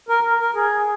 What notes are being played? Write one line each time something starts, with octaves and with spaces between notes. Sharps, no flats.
A#4
A#4
G#4